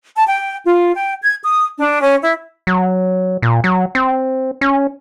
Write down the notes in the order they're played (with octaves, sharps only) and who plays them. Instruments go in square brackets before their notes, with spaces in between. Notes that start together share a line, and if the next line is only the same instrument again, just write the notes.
[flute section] A5
G5
F4
G5
G#6
D#6
D4
C#4
E4
[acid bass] F#3
A#2
F#3
C4
C#4